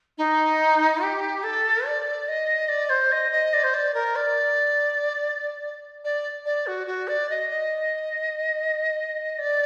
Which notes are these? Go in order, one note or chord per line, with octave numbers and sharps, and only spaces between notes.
D#4
G4
A4
D5
D#5
D5
C5
D#5
D#5
D5
C5
D5
A#4
D5
D5
D5
F#4
F#4
D5
D#5
D#5
D5